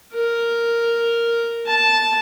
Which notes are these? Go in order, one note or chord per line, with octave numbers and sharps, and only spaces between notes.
A#4
A5